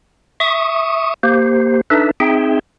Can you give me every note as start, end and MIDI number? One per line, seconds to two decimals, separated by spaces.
0.40 1.14 76
0.40 1.14 85
0.40 1.14 87
1.23 1.81 58
1.23 1.81 67
1.23 1.81 72
1.90 2.11 62
1.90 2.11 63
1.90 2.11 69
1.90 2.11 71
1.90 2.11 76
2.20 2.59 60
2.20 2.59 63
2.20 2.59 68
2.20 2.59 76
2.20 2.59 79